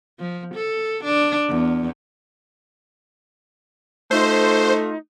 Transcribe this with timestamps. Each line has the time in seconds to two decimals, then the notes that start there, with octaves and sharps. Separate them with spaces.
0.20 F3
0.55 A4
1.04 D4
1.48 E2
4.11 A3 D#4 F4 C5